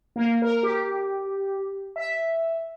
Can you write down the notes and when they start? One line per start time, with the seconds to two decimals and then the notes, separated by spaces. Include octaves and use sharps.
0.16 A#3
0.42 A#4
0.63 G4
1.96 E5